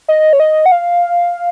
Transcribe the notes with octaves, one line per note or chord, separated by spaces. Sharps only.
D#5
C#5
D#5
F#5
F5